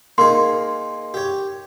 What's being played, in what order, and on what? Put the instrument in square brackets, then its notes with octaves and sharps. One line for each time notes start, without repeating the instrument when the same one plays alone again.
[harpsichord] A#3 D#4 G#4 [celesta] C6
[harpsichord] G4 C#5